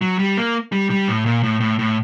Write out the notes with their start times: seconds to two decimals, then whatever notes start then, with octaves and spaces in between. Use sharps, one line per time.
0.01 F#3
0.19 G3
0.37 A#3
0.72 G3
0.90 G3
1.08 A2
1.26 A#2
1.43 A2
1.60 A2
1.79 A2